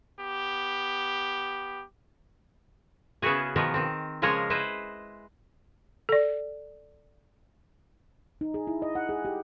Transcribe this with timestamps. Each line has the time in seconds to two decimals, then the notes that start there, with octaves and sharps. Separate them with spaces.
0.20 B3 G4
3.22 C#3 B3 C#4 E4 F#4 G#4
3.56 B2 D#3 F3 B3 A#4
3.74 D#3 C4
4.22 C#3 F3 G#3 G#4 A#4 C#5
4.50 E4 B4 C5 D#5
6.09 A4 D5
8.41 D#4
8.54 G#4
8.67 E4
8.82 D#5
8.95 F#5
9.09 G#4
9.25 G4